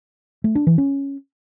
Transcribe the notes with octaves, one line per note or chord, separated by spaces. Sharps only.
A3
D4
E3
C#4